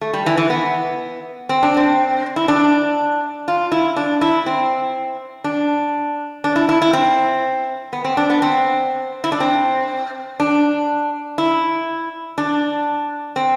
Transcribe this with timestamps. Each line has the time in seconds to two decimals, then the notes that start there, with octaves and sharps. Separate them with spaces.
0.01 A3
0.13 G3
0.26 E3
0.37 E3
0.50 B3
1.49 C4
1.63 D4
1.77 C4
2.36 E4
2.48 D4
3.48 F4
3.72 E4
3.96 D4
4.21 E4
4.46 C4
5.44 D4
6.44 D4
6.56 E4
6.69 E4
6.82 E4
6.93 C4
7.93 B3
8.05 C4
8.17 D4
8.30 B3
8.42 C4
9.24 E4
9.32 D4
9.40 C4
10.40 D4
11.38 E4
12.38 D4
13.36 C4